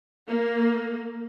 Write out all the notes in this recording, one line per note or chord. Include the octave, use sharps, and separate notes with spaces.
A#3